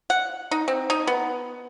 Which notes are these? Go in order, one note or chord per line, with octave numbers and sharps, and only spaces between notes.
F#5
D#4
C4
D#4
B3